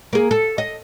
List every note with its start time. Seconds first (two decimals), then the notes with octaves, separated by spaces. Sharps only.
0.13 A#3 G#4
0.31 A4
0.58 D#5